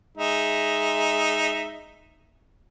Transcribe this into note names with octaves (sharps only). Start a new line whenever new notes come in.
G#3 D#4 E5